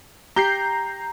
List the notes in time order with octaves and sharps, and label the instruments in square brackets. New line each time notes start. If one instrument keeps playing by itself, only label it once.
[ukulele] G4 [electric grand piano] A#5 G6 C7